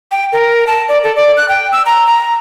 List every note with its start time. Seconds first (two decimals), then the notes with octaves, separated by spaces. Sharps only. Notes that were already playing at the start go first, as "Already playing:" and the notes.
0.11 G5
0.32 A#4
0.67 A5
0.89 D5
1.03 A4
1.16 D5
1.37 F#6
1.49 G5
1.72 E6
1.86 A#5
2.07 A#5